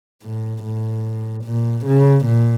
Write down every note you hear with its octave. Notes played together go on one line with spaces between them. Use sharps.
A2
A2
A#2
C#3
A#2